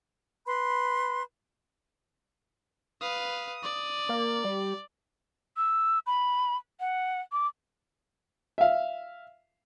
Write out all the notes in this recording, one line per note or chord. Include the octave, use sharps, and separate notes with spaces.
B4 B5 C6
B4 F5 D#6
D5
A#3
G3
E6
B5
F#5
D6
E5 F5